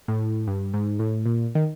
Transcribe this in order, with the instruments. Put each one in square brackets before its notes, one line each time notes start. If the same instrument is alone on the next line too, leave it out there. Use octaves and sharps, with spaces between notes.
[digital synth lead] A2
G2
G#2
A2
A#2
D#3